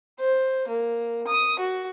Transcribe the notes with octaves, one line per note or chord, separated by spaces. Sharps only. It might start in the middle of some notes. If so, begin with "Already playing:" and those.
C5
A#3
D#6
F#4